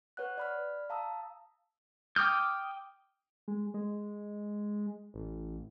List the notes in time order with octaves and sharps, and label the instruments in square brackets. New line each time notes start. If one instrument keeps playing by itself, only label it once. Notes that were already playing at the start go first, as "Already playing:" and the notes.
[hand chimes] B4 C#5 F#5 F#6
D5 B5 F6
F5 A5 A#5 D#6 E6
[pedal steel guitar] G5 D6 D#6 F6 G6
[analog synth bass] G#3
G#3
A1